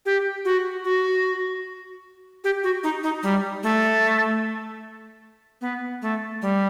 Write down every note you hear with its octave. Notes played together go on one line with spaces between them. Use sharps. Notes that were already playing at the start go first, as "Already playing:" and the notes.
G4
F#4
F#4
G4
F#4
D#4
D#4
G3
A3
B3
A3
G3